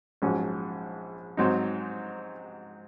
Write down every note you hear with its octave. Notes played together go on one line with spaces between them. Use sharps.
A#1 G#2 F#3 C#4
G#2 F#3 C4 D#4